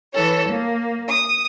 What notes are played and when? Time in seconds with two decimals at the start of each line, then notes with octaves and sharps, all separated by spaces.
0.13 E3 A4 C#5
0.49 A#3
1.08 D#6